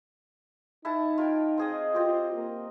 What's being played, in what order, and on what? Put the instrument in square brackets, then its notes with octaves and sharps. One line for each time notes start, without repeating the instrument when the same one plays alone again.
[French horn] D#4 [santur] E4 F#5 A5
[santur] F4 A#4 G5
C4 G#4 D#5
[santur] C4 G4 [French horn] F4
[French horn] A#3